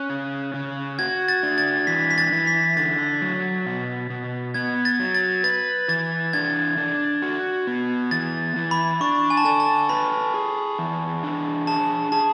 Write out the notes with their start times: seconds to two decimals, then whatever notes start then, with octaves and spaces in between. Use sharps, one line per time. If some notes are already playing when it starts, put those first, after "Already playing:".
Already playing: C#4 F#6
0.10 C#3
0.54 C#3
0.99 F#4 G#6
1.28 A6
1.43 D4
1.58 A6
1.87 E3 B6
2.11 B6
2.18 A6
2.32 E3
2.47 B6
2.77 D3 A6
3.22 F#3
3.66 B2
4.10 B2
4.54 B3 G#6
4.85 A6
5.00 F#3
5.14 A6
5.44 B4 A6
5.88 E3 A6
6.33 D4 G#6
6.77 D4
7.22 F#4
7.67 B3
8.11 E3 A6
8.56 E3
8.71 B5
9.01 D4 C#6
9.30 G#5
9.37 A5
9.45 A4 G#5
9.60 A5
9.89 B4 B5
10.34 G#4
10.79 E3
11.23 D4
11.67 G#4 A5
12.12 G#4 A5